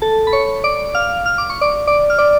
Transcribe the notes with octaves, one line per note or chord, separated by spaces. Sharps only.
A4 A5
B5
C#5 C#6
D5 D6
F5 F6
F6
D6
C#6
D5 D6
D5 D6
F6
D5 D6